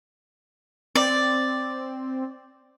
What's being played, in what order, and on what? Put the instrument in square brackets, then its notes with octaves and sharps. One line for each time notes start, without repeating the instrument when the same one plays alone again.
[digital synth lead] C4 [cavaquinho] D5